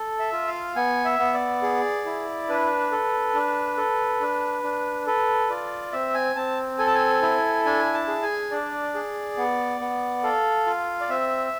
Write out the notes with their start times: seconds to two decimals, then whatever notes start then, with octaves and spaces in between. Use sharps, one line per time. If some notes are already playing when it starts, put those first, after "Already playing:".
Already playing: A4
0.19 E5
0.33 F4
0.47 F5
0.76 B3 G#5
1.05 E5
1.19 B3
1.34 D5
1.62 G#4
2.05 E4
2.49 D4 B4
2.91 A4
3.34 D4
3.77 A4
4.21 D4
4.64 D4
5.06 A4 B4
5.50 F4 D5
5.92 C4 E5
6.15 G#5
6.36 C4 A5
6.78 A4 G#5
6.87 A5
6.95 G#5
7.22 E4
7.65 D4 G#5
7.94 A5
8.08 G#4
8.22 G#5
8.51 D4 D5
8.94 G#4
9.37 B3
9.80 B3
10.23 A4 F5
10.67 F4
11.01 D5
11.09 C4 E5